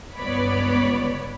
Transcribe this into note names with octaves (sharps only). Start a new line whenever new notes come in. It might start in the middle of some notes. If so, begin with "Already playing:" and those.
G1 C#2 B3 C#5 D5 B5